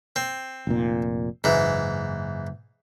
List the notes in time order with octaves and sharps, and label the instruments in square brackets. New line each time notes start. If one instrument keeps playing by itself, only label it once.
[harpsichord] C4
[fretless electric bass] F1 A#2
[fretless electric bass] F#1 [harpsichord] G#2 E3